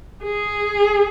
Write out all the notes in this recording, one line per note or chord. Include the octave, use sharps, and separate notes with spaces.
G#4